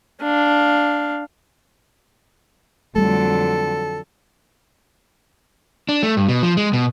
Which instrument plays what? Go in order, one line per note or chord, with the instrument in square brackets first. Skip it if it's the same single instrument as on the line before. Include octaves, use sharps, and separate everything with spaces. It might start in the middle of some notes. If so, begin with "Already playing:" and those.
[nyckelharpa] D4 F5
[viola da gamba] F2 D3 F#3 [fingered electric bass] G3 A3 [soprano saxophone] A4
[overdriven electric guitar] D4
A3
G2
B2
F3
G#3
B2